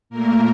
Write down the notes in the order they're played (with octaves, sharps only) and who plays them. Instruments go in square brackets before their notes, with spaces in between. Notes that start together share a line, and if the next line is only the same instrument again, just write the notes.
[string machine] A#2 A3 A#3 A#4